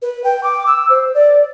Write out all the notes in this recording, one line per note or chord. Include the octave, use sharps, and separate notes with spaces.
B4
G5
D6
E6
C5
D5